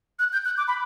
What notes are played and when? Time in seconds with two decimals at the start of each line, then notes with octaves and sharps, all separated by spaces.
0.19 F#6
0.33 G6
0.45 F#6
0.57 D6
0.68 B5